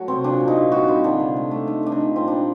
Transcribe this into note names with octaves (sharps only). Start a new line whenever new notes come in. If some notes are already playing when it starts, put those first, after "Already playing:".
Already playing: F#3 A3 F#4
C3 C4
A#2 D4
A#2
D#4
A#2
G3 F#4
G3 C4
D3 D4
C3
A3
A3
A3 D#4
A3 D4
D#4
A#2
A#2 C4
G3 D4